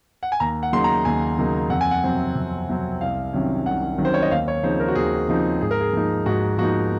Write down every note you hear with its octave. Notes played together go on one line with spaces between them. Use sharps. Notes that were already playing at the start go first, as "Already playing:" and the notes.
F#5
G#5
D#2 A#5
F#5
C#3 F#3 A#3 D#4 C6
A#5
D#2 G#5
C#3 F#3 A#3 D#4
F2 F#5
G#5
F#5
C3 F#3 C4
F2
C3 F#3 C4
C2 F5
C3 D#3 F#3 C#4
C2 F#5
C3 D#3 F#3 C#4
C5
C#5
D#5
D#2 F5
C#5
C#3 F3 C4 D#4 C5
A#4
F#4
D#2 G#4
C#3 F3 C4 D#4
G#2 G#4
A#4
G#4
F3 A#3 D#4
G#2 F#4
F3 A#3 D#4 F#4